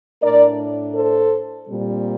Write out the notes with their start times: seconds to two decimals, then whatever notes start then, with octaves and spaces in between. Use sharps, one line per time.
0.23 A2 A3 D4 A#4 D5
0.96 A4 C5
1.68 A#2 G3 C4